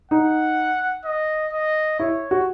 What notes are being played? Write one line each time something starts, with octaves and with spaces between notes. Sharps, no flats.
D#4 F#5
D#5
D#5
E4 C#5
F#4